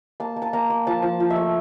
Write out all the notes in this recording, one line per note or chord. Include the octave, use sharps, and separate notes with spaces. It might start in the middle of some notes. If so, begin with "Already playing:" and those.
A#3 A5
A#3
A5
A#3 A#5
A#3
F3 A5
F3
F3
E5
A3